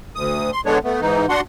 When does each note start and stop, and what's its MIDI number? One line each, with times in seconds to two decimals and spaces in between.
0.16 0.51 38
0.16 0.51 87
0.53 0.61 84
0.66 0.78 50
0.66 0.78 56
0.66 0.78 59
0.66 0.78 62
0.66 0.78 73
0.85 1.01 57
0.85 1.01 59
1.01 1.26 44
1.01 1.26 52
1.01 1.26 63
1.29 1.41 62
1.29 1.41 66
1.29 1.41 78
1.29 1.41 84